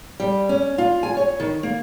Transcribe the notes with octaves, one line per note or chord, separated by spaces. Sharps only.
G3
C#4
F4
G#5
C#5
D#3
A#3